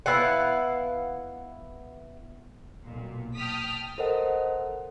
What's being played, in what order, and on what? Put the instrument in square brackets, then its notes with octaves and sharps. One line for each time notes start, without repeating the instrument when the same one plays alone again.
[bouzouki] B3 E4 F5 F#5
[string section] B1 A#2
G5 A5 D#6 F6 B6
[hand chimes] A4 A#4 C5 D#5 F#5